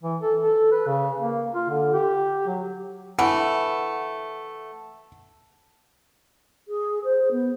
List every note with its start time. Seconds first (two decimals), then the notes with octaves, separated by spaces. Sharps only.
0.03 E3
0.22 A4
0.42 A4
0.72 B4
0.87 C#3
1.20 A#3
1.55 F4
1.69 D3
1.93 G4
2.47 F#3
3.19 E3 A3 F#5
6.68 G#4
7.04 C5
7.31 B3